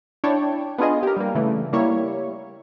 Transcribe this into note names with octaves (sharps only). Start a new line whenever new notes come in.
D4 E4 C#5 D5 G5 A5
B3 D4 F4 G#4 D#5
G4 A#4
G3 A#3
C#3 E3 A3
G3 A#3 E4 C#5